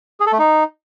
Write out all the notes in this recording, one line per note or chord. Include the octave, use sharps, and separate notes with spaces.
G#4
A4
A3
D#4